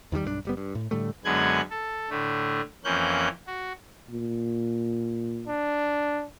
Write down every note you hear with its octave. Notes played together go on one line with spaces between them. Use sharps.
E2 D#3 E3 G3
B1 G2 G3 D4
F#1 G3 B3
G2
A2
A2 D3 G3 A3
F#2 D3 G#3 B3 F#6 G#6
A4
A2 D3 A3
F2 E3 A#3 C#4 F#6 G6
F#4
A#2
D4